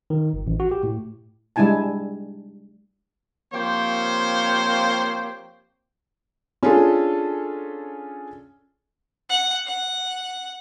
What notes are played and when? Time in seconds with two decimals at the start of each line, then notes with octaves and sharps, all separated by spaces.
0.10 D#3
0.33 G1
0.47 A1
0.60 F#4
0.71 G4
0.83 A2
1.56 G3 G#3 D4 E4 G#5 A5
3.54 F3 A#3 C4 G4 C5 C#5
6.63 C#4 D4 F4 G#4 A4
9.30 F#5
9.67 F#5